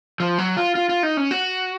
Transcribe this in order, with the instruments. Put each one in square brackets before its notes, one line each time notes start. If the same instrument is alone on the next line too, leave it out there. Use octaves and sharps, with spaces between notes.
[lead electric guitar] F3
F#3
F4
F4
F4
D#4
C#4
F#4